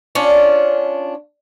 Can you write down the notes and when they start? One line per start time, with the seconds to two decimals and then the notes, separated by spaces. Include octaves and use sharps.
0.15 C#4 D4 F4